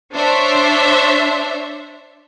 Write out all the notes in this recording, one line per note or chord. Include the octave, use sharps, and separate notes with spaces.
D4 C5 C#5 E5